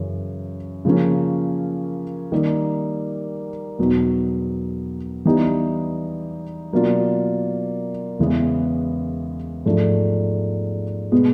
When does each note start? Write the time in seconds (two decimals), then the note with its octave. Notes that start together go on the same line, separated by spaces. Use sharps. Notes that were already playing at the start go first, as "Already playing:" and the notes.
Already playing: F#2 C#3 E3
0.85 C#3 F3 A#3 C#4
2.32 D#3 G3 A#3 D#4 G4
3.79 E2 B2 F#3 B3 D#4
5.25 E3 G3 B3 D#4 G4
6.72 B2 F#3 A#3 D4 F4
8.19 E2 C#3 E3 G#3 B3
9.65 G#2 F3 A3 D4
11.12 B2 G#3 B3